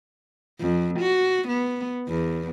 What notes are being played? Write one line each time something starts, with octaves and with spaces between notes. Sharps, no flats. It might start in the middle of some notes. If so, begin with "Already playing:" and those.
F2
F#4
B3
E2